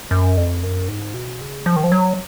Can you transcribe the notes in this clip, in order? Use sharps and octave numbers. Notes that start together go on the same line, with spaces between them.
F#2
F2
F#2
G#2
B2
C#3
F3
D#3
F3
F#3